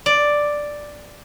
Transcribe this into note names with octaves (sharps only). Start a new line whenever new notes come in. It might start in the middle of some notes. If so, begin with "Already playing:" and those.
D5